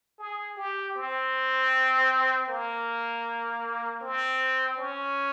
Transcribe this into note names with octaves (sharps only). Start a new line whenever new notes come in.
G#4
G4
C4
A#3
C4
C#4